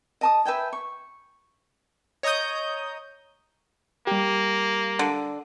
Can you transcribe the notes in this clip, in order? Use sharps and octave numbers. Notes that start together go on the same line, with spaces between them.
D#5 A5 D#6
B4 E5 G5 G#5
C#6
C#5 D#5 A#5 D#6 G6
G3 A#3 G4
D3